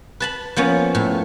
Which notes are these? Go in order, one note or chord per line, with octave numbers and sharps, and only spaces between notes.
B4 A5 B5
F3 A#3 B3 C#4
A2